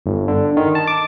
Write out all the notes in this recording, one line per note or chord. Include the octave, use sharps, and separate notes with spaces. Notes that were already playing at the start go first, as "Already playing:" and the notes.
G1
D3
D#3
A5
D6